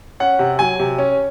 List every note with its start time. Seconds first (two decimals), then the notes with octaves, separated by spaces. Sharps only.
0.20 C#4 F#5
0.39 C3
0.59 F#3 G#5
0.79 C3
0.98 C#4